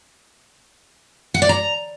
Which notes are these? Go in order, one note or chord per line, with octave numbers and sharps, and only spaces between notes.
F#5
D5
A#5